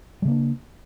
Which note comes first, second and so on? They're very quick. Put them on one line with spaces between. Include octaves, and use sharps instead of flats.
G3 C#3 A#3 D4